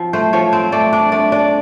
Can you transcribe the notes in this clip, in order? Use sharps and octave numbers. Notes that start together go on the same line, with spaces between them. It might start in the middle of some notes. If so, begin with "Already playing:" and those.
Already playing: F3 C4
A3 C5
F3 C#5
C4 C5
A3 D5
D4 D5
A3 D5
D4 D5